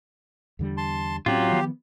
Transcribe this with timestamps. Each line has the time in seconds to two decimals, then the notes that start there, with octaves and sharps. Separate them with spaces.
0.59 E2 D3 G3
0.77 A5 C6
1.26 A2 F#3 C4 C#4 F4 G4
1.52 D#3 F3 B3